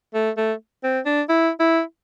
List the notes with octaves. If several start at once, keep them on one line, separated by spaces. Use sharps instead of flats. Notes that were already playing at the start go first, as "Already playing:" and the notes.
A3
A3
C4
D4
E4
E4